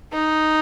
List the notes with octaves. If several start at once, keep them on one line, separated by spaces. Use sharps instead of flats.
D#4